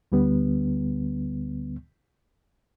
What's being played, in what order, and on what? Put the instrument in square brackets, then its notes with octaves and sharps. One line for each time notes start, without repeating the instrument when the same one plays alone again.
[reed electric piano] D2 D3 G3 B3